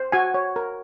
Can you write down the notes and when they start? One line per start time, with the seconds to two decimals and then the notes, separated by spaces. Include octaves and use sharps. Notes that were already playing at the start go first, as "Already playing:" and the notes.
Already playing: C5
0.12 F#4 G#5
0.34 C#5
0.56 A#4